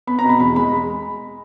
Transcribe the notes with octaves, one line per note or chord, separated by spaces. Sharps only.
B3 B5
A#5
B2
B5
E2 B5
G#3 B5